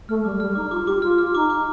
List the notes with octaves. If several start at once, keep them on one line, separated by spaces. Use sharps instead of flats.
A3 F6
G3 D6
G3 F6
D#4 D6
F4 D6
G4 D6
F4 F6
F6
D#4 D6
D6